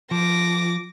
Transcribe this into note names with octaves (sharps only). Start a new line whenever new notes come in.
F3 D6 A#6